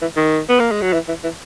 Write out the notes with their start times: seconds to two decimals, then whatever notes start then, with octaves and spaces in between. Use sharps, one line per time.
0.01 E3
0.16 D#3
0.49 B3
0.60 A#3
0.71 G#3
0.81 F#3
0.93 E3
1.08 E3
1.24 E3